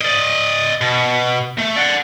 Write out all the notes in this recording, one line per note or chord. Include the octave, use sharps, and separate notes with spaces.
D5 D#5
B2
A3
D5 F#5